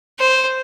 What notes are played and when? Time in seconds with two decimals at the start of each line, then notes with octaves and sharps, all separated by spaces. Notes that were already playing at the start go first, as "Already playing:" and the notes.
0.19 C5